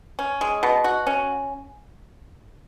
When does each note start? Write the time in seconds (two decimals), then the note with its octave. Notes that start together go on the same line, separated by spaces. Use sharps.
0.19 C#4
0.41 G#3
0.63 B2
0.84 F#4
1.07 C#4